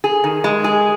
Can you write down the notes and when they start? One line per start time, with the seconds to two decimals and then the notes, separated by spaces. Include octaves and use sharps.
0.04 G#4
0.24 D#3
0.44 G#3
0.64 G#4